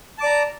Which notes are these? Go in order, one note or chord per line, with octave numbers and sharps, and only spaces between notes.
D5 A5 A#5 D6